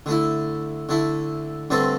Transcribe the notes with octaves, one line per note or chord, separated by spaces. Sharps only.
D3 A3 E4
D3 A3 E4
G2 D3 A3 C4 A4